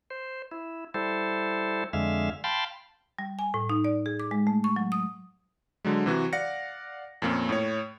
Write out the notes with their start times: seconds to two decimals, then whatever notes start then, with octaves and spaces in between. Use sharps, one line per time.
0.10 C5
0.51 E4
0.94 G3 E4 A4 C5
1.93 F2 D3 G#3 E5 F5
2.44 F5 G5 A5 B5 C6
3.19 G3
3.39 G#5
3.54 A2
3.70 D#4
3.84 D5
4.06 G#4
4.20 D6
4.31 G#3
4.47 A3
4.64 C#6
4.76 F#3
4.92 D#6
5.85 D3 F#3 G#3
6.06 C3 E3 F#4
6.33 D5 F5 F#5 A#6 C#7
7.22 F2 A#2 A#3 C#4
7.49 A2 C#5